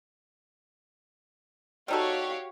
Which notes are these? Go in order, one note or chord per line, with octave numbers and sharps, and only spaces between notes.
G3 D#4 F#4 G4 A4 C#5 F5